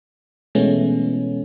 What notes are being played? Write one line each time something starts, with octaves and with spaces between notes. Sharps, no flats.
B2 E3 G#3 A3 B3 C#4